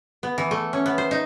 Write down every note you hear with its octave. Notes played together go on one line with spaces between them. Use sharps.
B3
E3
A3
C#4
B3
C5
D#4